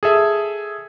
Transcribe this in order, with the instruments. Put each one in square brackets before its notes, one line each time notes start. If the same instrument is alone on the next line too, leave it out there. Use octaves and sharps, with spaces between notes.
[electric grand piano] G#4 A4 E5